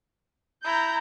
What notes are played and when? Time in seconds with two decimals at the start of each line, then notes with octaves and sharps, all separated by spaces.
0.64 E4 A#5 G6